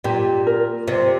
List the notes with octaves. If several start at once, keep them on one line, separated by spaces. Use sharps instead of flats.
A#2 G4
A#4
C3 D5